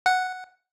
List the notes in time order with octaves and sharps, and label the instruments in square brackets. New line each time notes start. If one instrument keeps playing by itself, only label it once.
[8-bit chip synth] F#5